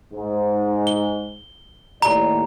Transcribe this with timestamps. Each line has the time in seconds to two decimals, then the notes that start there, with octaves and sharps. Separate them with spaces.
0.12 G#2
0.87 G7
2.02 D#2 A2 D5 A#5